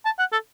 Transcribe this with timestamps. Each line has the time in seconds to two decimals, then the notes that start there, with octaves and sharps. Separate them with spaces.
0.05 A5
0.19 F#5
0.32 A4